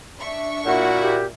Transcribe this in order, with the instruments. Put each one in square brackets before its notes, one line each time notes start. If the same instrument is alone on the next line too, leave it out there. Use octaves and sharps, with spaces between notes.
[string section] D4 E5 C#6
[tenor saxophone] A#2 [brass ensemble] A#3 E4 F#4 [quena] F#5
[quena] G4